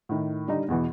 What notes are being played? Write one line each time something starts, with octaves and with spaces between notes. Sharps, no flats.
A2 D#3
D3 G3 D#4
E2 B2 E3